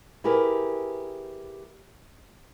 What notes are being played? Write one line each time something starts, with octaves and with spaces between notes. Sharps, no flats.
E4 G4 G#4 A#4 B4